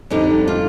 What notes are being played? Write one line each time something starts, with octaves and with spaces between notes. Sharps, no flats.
F2 D3 G3 D#4
F4